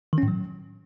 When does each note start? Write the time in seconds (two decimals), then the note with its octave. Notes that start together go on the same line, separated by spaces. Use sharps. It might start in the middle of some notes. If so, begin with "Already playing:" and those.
0.13 D#3
0.18 C#4
0.23 A2
0.28 F#3